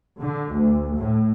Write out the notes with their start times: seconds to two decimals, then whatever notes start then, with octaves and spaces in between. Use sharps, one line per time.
0.19 D3
0.51 D2
0.95 A2